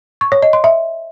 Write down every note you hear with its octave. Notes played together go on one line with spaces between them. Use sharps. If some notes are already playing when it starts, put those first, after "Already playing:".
C#6
C#5
D#5
C6
E5